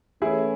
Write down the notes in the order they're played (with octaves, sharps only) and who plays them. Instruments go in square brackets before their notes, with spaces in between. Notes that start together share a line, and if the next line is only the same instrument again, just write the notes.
[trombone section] E3 A3 C#4 [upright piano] E4 G#4